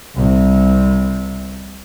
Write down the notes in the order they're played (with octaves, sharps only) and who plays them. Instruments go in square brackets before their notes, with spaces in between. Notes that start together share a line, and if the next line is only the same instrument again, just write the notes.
[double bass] C2 C3